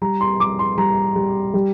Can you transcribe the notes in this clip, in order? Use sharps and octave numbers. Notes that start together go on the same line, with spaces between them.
G3 A#5
C6
G3 D6
C6
G3 A#5
G3
G3